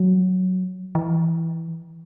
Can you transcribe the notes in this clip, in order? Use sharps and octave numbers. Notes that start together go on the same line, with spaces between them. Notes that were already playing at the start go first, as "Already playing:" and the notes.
Already playing: F#3
E3